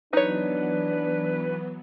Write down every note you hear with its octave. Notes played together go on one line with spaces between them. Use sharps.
E3 F#3 B3 D4 D#4 B4 C#5